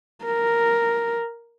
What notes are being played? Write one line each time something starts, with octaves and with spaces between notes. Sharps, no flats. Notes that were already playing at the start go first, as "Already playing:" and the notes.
A#4